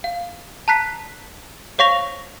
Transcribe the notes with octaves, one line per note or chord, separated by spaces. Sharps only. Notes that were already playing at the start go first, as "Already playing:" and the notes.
F5
A5 A#5 F#6 B6 C7
C5 C#5 F5 C#6 A#6 F7